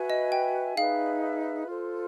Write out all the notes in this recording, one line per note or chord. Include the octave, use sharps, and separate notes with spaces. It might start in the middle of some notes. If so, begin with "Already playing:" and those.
Already playing: F#4 B4 E5 G#5
D#5
G5
D#4 G#4 B4 E5 F5
F4 A4 C5